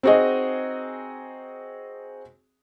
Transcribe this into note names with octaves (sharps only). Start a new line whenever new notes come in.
C4 D#4 F#4 G#4 D#5